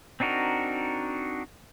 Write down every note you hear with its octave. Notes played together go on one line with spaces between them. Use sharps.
C4 D4 D#4 F#4 A#4